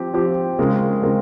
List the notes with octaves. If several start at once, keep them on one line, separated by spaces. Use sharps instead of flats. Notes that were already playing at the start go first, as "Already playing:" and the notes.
Already playing: F3 C4 G4
F3 C4 G4
C#3 G#3 C4 F4 A#4
C#3 G#3 C4 F4 A#4